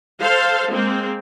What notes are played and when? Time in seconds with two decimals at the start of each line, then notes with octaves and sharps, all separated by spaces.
0.21 A4 C5 F5
0.72 G#3 A#3 C4